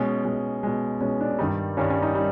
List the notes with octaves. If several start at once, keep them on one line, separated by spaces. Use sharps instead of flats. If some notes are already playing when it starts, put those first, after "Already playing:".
Already playing: B2 G#3 C#4
B2 G#3
B2 G#3
B2 G#3 C#4
D4
G2 D#3 G3 D#4
G2 D#3 G3 C#4
C#4
D#4
G3